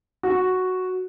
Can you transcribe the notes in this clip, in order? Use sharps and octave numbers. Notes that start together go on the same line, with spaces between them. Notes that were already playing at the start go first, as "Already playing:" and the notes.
F#4